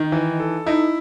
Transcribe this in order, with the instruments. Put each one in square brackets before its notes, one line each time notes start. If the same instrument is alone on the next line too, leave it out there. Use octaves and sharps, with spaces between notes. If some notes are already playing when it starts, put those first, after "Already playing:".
Already playing: [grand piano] D#3 [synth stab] D#4
[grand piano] E3
A4
[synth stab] D#4 [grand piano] E4